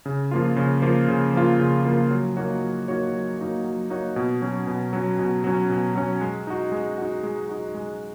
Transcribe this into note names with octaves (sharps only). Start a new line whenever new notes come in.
C#3
F3 A#3 F4
C#3
F3 A#3 F4
C#3
F3 A#3 F4
C#3
F3 A#3 F4
F#3
A#3 D#4 F#4 C#5
F#3
A#3 D#4 F#4 C#5
F#3
A#3 D#4 F#4 C#5
F#3
A#3 D#4 F#4 C#5
B2
F#3 C#4
B2
F#3 C#4
B2
F#3 C#4
B2
F#3 C#4
G#3
D#4 F#4
G#3
D#4 F#4
G#3
D#4 F#4
G#3